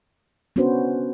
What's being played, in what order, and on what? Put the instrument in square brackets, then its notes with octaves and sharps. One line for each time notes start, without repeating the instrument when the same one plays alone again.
[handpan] B3 C#4 D4 F#4 B4 C5